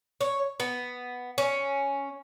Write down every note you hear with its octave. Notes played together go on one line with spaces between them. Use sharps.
C#5
B3
C#4